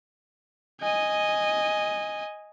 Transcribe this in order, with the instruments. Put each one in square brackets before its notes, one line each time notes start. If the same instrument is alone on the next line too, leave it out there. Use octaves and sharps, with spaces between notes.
[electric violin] D#5 G#5